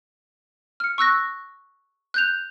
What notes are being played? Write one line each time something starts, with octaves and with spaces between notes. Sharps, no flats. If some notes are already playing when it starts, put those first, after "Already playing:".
F6 C#7
C#6 E6 F#6 A#6
F#6 G6 F7